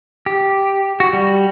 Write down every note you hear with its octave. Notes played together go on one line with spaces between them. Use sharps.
G4
F#4
G3